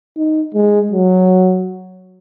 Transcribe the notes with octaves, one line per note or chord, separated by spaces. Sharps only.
D#4
G#3
F#3